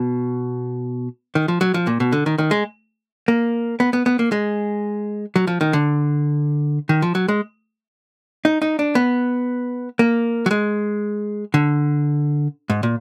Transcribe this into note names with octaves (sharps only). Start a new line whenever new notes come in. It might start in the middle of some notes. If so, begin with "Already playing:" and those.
Already playing: B2
D#3
F3
F#3
F3
A#2
B2
D3
D#3
D#3
G#3
A#3
B3
B3
B3
A#3
G#3
F#3
F3
D#3
D3
D#3
F3
F#3
G#3
D#4
D#4
D4
B3
A#3
F#3
G#3
D3
G#2
A#2